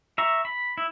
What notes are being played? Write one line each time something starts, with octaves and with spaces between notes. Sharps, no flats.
E5 A#5 C#6
B5
E4